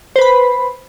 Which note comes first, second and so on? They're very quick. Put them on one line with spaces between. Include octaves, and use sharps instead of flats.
C5 B4 B5